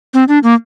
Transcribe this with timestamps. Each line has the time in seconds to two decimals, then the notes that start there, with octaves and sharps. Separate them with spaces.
0.14 C4
0.28 D4
0.43 A#3